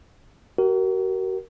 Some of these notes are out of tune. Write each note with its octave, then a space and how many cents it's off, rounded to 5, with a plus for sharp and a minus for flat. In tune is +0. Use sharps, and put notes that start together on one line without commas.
F#4 +40 A#4 +0